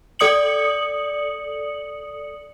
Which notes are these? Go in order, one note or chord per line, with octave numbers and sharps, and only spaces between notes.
A4 D5 D#6 C#7 F#7